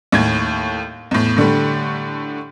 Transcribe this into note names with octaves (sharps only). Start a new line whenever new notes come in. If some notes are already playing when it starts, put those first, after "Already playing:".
D#2 A2 G#6
E2 A2
A2 D3 G3 A3